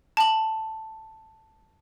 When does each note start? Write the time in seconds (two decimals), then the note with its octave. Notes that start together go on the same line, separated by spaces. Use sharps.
0.17 A5 F#7